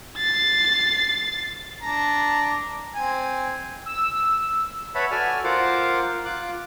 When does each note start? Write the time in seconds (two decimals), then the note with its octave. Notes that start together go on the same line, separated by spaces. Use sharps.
0.17 A6 C7
1.83 D4 A5 A#5
2.95 C4 G#5
3.86 E6
4.95 B4 C#5 E5 F#5 A5 B5
5.11 F#4 A4 D5 G#5 E6 F6
5.44 F4 A#4 C5 F#5 D6
6.25 F4 D6 F#6